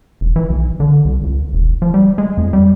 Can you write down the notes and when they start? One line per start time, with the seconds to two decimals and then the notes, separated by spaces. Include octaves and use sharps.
0.21 E1
0.36 E3
0.50 B1
0.80 D3
1.05 C2
1.23 C#2
1.53 E1
1.82 F3
1.94 G3
2.18 G#3
2.37 F2
2.53 G3